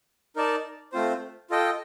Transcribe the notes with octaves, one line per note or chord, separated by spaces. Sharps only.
D#4 A#4 D5 A5
A3 C4 F4 C5
F4 A4 D#5 G5